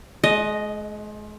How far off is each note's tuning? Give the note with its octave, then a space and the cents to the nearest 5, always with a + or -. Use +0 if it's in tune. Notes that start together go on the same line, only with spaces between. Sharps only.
G#3 +35 D#5 +0